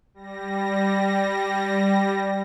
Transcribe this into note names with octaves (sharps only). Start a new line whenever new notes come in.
G3 A#6